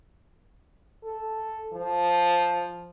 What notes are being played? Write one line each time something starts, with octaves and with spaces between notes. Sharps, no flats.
A4
F3